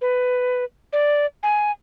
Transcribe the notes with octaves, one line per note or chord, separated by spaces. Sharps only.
B4
D5
G#5